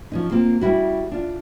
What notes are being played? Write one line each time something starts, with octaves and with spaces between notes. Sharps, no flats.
F3 C#4 D#4
A#3 C4 F4
G3 C#4 E4 F#4
D4 F4